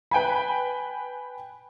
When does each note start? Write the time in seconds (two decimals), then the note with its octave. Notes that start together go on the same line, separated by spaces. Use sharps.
0.11 B4 G5 G#5 B5